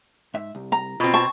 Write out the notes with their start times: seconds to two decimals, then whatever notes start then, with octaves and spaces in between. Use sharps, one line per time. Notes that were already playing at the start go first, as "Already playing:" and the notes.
0.34 G#2 E5
0.55 C2
0.72 A#5
1.00 B2 C4 F4
1.14 A5 C#6